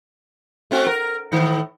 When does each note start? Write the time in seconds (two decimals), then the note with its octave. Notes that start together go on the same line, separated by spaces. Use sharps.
0.71 A3 C4 F#4
0.87 A#4
1.32 A2 D#3